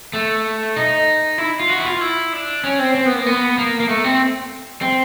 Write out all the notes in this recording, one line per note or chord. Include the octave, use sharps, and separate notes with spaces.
A3
D#4
E4
F4
F#4
E4
F4
E4
D4
C#4
C4
C4
B3
A#3
B3
A#3
A#3
A3
C4
C4